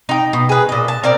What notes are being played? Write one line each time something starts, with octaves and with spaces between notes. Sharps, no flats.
D#4 G5
B2
G#4 B4
A#2 D#5
A5
C4 A#4 D5